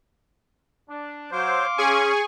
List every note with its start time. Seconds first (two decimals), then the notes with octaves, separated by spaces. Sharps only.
0.89 D4
1.32 F#3 C5 F5 C6 D6
1.78 C#4 G#4 G#5 C#6